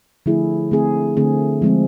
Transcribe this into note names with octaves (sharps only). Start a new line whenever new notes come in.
D3 F3 A3 E4 G#4
D3 A3 C4 G#4
D3 A3 C4 G#4
F3 G#3 C4